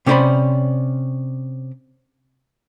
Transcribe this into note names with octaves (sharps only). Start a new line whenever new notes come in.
C3 C#4 D#4 C5 D5 B5